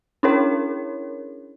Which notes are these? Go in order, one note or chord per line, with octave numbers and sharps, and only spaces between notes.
C#4 D4 E4 G#4 A#4 C#5